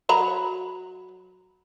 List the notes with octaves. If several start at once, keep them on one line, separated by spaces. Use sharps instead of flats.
F#3 A#5 B5